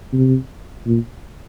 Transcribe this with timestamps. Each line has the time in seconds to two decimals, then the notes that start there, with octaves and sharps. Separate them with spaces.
0.13 C3
0.86 A#2